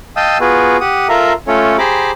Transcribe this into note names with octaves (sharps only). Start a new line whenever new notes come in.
D#5 F5 G5 A5 D#6 E6
B3 F4 F#4 G#4 B4
G4 F#5 D#6
F4 A4 A#4 E5 F5 A#5
A3 C#4 F4 A4 C#5
G4 G#4 C5 A#5 B5 D6